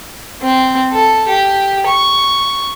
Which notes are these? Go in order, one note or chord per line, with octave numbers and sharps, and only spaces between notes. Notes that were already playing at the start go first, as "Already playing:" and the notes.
C4
A4
G4
C#6